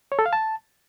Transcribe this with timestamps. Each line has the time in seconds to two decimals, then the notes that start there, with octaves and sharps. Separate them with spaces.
0.12 C#5
0.19 A4
0.26 F5
0.33 A5